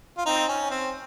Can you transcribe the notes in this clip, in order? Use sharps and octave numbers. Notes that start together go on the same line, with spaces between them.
F4
C4 D#4
C#4
C4